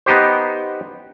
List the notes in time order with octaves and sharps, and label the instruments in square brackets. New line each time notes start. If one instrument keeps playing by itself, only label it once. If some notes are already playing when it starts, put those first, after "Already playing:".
[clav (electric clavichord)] B3 D#4 G4 C5